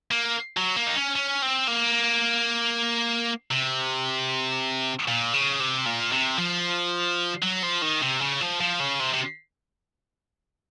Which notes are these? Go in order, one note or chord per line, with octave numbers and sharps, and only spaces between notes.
A#3
F#3
A#3
D#4
C#4
C#4
C4
A#3
C3
A#2
C#3
C3
A#2
C3
F3
F#3
F3
D#3
C3
C#3
F3
F3
C#3
C3
C3